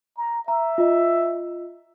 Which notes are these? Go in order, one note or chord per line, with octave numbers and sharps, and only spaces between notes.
A#5
E5 A#5
F4 D#5